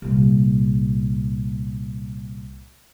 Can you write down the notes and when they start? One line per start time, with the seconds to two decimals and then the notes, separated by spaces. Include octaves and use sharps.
0.02 C2 A#2